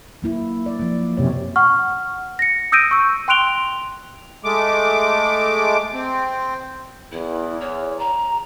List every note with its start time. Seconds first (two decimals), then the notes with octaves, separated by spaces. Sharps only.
0.22 F#3 A#3 E4
0.66 D5
0.79 F3 A#3
1.17 F#2 C3 C#5
1.56 F#5 C#6 F6
2.39 A#6 C#7
2.72 D#6 E6 G6 A#6 D7 D#7
2.91 C#6 E6
3.28 G5 C6 F#6 D7 F7 G7
4.44 G#3 A3 D6
5.94 C4
7.12 E2 E4
7.61 C#5
7.99 A#5